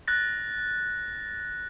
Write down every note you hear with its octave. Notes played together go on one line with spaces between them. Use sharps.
F#6 A6 A#6